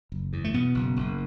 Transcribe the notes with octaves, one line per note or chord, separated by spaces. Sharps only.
F#1
E2
A3
B2 B3
F#1
F#1